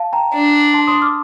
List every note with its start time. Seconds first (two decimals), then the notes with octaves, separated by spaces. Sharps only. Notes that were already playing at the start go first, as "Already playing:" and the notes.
Already playing: F5 A5
0.13 G5 A#5
0.33 D4
0.74 A5 C6
0.87 C6 D#6
1.02 D6 F6